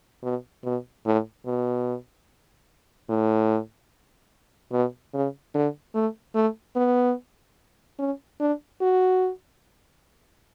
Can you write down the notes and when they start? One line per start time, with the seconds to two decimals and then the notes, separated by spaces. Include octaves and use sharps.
0.23 B2
0.64 B2
1.06 A2
1.46 B2
3.09 A2
4.72 B2
5.14 C#3
5.54 D3
5.94 A3
6.35 A3
6.76 B3
7.99 C#4
8.40 D4
8.81 F#4